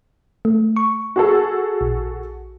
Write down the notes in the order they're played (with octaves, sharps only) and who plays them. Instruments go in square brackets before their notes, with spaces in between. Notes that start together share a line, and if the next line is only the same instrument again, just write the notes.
[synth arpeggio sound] A3
C#6
[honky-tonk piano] F#4 G#4 A4
[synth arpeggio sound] A#1